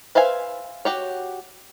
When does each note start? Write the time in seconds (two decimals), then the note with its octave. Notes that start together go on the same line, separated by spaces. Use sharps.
0.15 B4 C5 E5 F5 G#5
0.85 F#4 G4 C#5